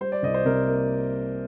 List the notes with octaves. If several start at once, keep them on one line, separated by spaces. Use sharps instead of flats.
G3 C5
D5
C2 D#5
C5
C3 A#4
A#3